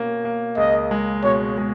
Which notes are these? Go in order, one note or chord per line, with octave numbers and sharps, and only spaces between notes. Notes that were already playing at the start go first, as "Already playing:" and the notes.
Already playing: B2 A#3 C#4
A#3
C#2 D#5
G#3
B2 C#5
G#3